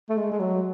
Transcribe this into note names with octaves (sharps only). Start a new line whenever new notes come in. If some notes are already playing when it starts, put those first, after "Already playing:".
A3
G#3
G#3
F#3